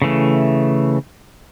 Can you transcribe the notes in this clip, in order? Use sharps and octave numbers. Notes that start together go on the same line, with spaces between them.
C#3 E3 A3